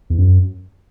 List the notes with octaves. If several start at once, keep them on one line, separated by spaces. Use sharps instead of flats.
E2
F#2